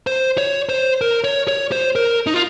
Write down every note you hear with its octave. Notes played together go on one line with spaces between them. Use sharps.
C5
C#5
C5
A#4
C#5
C#5
C5
A#4
D#4
F4